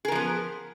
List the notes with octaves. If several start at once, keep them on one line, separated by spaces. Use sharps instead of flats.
F3 B3 G#4 A#4